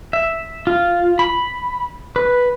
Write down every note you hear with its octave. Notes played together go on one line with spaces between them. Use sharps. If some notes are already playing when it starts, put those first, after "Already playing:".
E5
F4
B5
B4